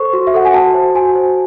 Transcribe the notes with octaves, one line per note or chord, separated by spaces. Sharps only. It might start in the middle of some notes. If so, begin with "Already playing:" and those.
Already playing: A4 C5 C#6
F#4
E5
A4 F#5
G#5
F#4 A5
C5
F#4 G#5
C5